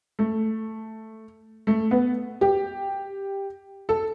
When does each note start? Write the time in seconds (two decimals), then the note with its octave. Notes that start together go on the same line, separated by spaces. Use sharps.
0.19 A3
1.67 A3
1.91 B3
2.41 G4
3.89 A4